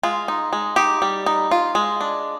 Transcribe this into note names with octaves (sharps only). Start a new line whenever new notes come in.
G#3 F4
D#4
G#3
D#4 G4
G3
D#4
F4
G#3
D4